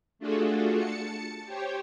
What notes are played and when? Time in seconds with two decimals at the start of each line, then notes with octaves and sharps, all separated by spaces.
0.19 A3 D4 F4 F#4 G#4 A4
0.77 A5 C#7
1.45 G4 C5 C#5 G5